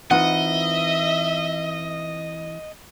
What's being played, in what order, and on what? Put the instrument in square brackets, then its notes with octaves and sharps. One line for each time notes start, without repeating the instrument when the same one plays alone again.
[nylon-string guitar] E3 C4 D#4 [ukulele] F4 F#5 [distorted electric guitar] D#5 [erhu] E5